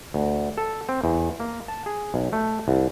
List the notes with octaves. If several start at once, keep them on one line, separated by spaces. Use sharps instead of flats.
D2
A4
C4
E2
A#3
A5
G#4
B1
A3
C2